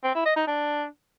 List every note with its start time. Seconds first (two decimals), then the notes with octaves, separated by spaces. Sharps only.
0.04 C4
0.15 E4
0.26 D#5
0.36 D#4
0.47 D4